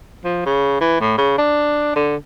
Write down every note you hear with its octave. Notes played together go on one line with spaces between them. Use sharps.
F3
C#3
E3
A2
C#3
D4
D3